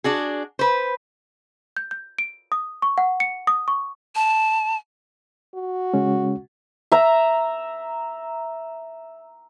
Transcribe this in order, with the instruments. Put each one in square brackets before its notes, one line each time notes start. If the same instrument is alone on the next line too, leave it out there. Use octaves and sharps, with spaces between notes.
[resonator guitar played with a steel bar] D4 F#4 G#4
B4 C5
[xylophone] G6
G6
D7
D#6
C#6
F#5
C#7
D#6
C#6
[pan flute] A5
[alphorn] F#4
[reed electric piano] C#3 G#3 C#4
[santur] E5 A#5